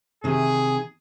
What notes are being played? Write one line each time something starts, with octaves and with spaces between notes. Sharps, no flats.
C3 D#3 G#4